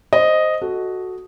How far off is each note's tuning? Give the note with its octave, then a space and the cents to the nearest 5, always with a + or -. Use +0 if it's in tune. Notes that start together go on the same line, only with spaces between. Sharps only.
C5 +0 D#5 +0
F#4 +0 A4 -10